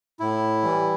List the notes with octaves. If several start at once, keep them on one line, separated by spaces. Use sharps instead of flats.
A2 E4
E3 G3